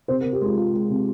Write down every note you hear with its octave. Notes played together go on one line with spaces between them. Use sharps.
C3 C5
A#4
C3
G4
G#3 F4
G#3 F4
G#3
C3